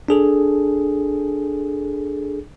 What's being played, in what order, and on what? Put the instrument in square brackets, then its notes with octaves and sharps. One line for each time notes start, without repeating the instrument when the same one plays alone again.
[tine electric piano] D4 G#4 A4